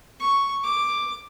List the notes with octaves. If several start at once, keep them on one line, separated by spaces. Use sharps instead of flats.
C#6
D6